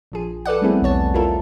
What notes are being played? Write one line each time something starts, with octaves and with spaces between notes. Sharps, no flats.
A#1 F3 G#4
A4 B4 D5 F#5
G3 A3 B3 C4 E4 G#4
B1 E2 C#5 A5
E4 F4 A4 A#4